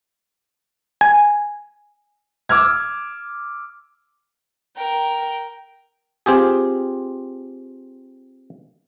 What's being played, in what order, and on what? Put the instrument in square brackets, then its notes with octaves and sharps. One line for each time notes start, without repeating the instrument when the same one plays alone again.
[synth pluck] G#5
[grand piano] D6 E6 F6 G#6
[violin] A#4 G5
[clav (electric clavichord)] C4 F4 G4 G#4